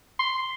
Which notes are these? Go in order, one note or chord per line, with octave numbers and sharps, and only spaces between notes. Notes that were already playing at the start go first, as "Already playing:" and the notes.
C6